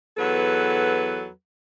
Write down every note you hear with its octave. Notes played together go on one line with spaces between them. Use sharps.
E2 F#3 A4 B4